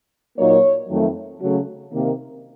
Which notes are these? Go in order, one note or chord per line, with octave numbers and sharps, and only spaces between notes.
A#2 F#3 A#3 D#4 C#5
F2 D#3 F#3 A3
C#3 F#3 A3
C3 D#3 A#3